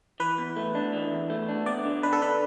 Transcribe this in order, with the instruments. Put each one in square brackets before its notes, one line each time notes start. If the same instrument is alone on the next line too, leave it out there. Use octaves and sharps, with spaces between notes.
[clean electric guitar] E3 [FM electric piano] B4
[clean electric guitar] E2
A3
D4
E3
E2
A3
D4
[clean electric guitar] B3 [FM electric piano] D5
[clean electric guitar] D3
[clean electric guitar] D4 [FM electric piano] B4
[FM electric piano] A4
[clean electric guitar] D3 [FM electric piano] B4